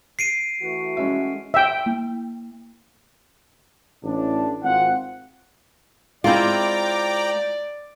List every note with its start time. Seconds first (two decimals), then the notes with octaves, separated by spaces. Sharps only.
0.19 C7 D7 D#7
0.61 E3 A3 F#4
0.97 G#3 C#4 E5
1.54 E5 G5
1.86 A#3
4.04 A1 A2 D4
4.63 G#1 C4 F4 F#5
6.24 G#3 C4 E4 F4 D5 G5 A#5 D6